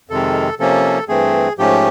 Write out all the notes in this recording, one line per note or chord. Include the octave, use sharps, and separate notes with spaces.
F2 C3 D#3 G#3 A4
C3 F3 A#3 C#4 A4
G2 E3 A3 C4 G#4
G#2 F3 A3 C#4 G4